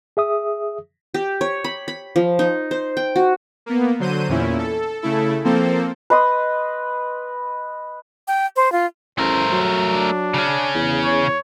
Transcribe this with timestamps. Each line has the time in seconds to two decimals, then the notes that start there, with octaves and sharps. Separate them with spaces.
0.17 G#4 E5 D#6
1.14 G4
1.41 C#5
1.64 B5
1.88 B5
2.16 F3
2.39 D#4
2.71 C5
2.97 G5
3.16 F#4
3.66 A#3 B3
3.99 D3 F#3 C5 G6 D#7
4.28 E2 A#2 C#4 E4
4.58 A4
5.02 C#3 A3 E4 A4
5.44 F3 A#3 C4 A4 C5
6.10 B4 D#5 C6 D#6
8.28 G5
8.56 C5
8.72 F4
9.19 A1 A3 A#4 C5
9.53 F#3
9.90 D4
10.34 C#3 C#4
10.75 E2
11.04 C#5